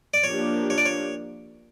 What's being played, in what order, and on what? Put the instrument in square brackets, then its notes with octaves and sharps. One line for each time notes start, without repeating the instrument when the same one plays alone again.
[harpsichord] D5
[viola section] F3 A#3 D4 G4 [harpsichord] C#5
[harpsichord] C#5
D5
C#5